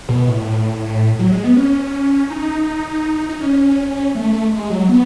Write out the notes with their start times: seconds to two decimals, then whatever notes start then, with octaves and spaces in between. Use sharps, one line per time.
0.09 B2
0.27 A2
1.19 F#3
1.31 G#3
1.44 B3
1.56 C#4
2.30 D#4
3.29 D#4
3.41 C#4
4.15 A3
4.33 A3
4.52 G#3
4.70 F#3
4.89 B3